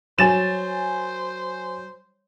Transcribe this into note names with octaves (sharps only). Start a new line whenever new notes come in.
F#3 C5 G#5 A6 E7